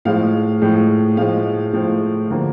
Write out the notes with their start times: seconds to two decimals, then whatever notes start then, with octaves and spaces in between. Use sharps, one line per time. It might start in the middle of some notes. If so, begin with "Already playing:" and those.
0.05 A2 F3 G#3 F5
0.61 A2 F3 G#3
1.17 A2 F3 G#3 F5
1.73 A2 F3 G#3
2.30 D3 F3 A#3